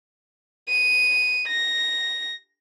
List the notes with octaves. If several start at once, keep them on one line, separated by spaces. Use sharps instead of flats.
D#7
A#6